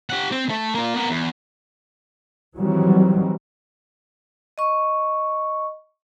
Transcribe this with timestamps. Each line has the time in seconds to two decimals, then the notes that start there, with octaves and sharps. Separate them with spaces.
0.10 G4 F#5
0.31 C4
0.50 A3
0.75 A#3 F4
0.95 B3 A#4
1.10 E2
2.57 D#3 E3 F#3 G3 C4
4.58 D#5 C#6